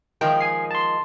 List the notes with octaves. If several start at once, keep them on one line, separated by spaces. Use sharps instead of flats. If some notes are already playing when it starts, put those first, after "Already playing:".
D#3 F3 G#3 G5
G#5 C7
A5 C6